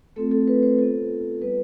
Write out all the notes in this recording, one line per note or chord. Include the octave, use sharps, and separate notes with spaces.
A3 C4 F4 A4
A4
B4
C5
B3 F4 A4
G3 B3 F4 B4